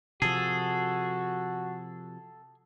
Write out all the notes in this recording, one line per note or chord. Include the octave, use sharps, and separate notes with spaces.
C3 F3 F#4 G#4 A4